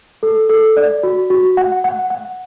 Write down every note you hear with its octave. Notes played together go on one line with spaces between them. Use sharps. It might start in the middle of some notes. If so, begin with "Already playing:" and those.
A4
A4
D5
F#4
F#4
F#5
F#5
F#5